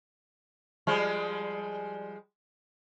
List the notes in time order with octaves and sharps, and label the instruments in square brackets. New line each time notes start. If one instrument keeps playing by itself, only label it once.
[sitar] F3 G3 G#3